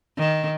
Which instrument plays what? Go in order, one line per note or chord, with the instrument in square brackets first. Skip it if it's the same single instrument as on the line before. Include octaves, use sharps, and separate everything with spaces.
[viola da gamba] D#3